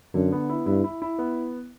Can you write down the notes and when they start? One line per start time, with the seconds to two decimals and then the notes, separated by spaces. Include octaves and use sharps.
0.14 F#2 D3
0.32 B3
0.49 E4
0.66 G2 E4
0.84 E4
1.02 E4
1.19 B3